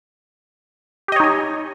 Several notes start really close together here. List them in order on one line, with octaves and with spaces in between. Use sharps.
G4 D#5 C#5 D#4 G#5